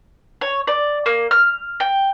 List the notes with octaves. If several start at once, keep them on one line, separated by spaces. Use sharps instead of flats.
C#5
D5
A#3
F6
G5